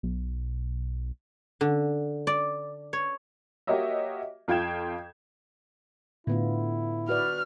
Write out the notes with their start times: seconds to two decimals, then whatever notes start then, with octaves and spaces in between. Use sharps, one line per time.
0.03 B1
1.61 D3
2.27 D5
2.93 C#5
3.67 A#3 F#4 G4 C#5 D#5 E5
4.48 F2 F4 G5 G6 G#6 E7
6.27 A2 D3 B3 E4 F4
7.09 F#4 B4 D5 F6